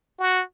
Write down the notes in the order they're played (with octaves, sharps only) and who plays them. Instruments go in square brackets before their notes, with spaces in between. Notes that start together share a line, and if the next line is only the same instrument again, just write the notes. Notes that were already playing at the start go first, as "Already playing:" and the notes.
[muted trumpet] F#4